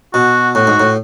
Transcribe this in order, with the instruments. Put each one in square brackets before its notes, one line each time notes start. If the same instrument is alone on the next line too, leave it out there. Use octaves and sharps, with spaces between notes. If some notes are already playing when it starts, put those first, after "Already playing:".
[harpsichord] B2 [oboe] F#4
[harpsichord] A2 [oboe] F#4
[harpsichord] G#2
A2